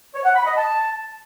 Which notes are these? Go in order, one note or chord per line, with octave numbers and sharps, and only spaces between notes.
C#5
F#5
B5
D#5
A5